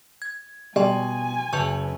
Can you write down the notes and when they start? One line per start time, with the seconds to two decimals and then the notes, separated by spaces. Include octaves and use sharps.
0.22 G#6
0.76 B2 G3 G5 G#5 C6 C#6
1.53 F#1 B4 A5 C#6 G6